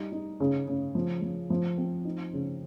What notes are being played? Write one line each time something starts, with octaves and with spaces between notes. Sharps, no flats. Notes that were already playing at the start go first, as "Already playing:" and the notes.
Already playing: G3 D#4
D#4
C#3
C#3
F3
F3
F3
C4
D#4
C#3